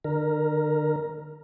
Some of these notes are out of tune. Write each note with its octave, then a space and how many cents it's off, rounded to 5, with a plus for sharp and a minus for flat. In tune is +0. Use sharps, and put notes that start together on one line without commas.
D3 +40 A#4 +0